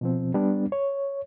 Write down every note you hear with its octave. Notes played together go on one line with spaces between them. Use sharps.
B2 F3 C4
G3 B3 D4
C#5